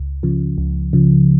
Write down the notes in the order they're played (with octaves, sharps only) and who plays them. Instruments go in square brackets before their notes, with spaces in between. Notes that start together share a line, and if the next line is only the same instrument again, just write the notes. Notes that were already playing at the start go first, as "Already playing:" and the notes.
Already playing: [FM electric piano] C#2
C#3 F3
C#2
C#3 F3